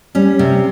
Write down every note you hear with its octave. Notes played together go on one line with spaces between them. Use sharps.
G3 C#4
C3